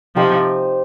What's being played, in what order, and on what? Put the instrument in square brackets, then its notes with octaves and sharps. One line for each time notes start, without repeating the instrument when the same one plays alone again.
[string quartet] C3 F3 [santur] D#4 G4 C5 D#5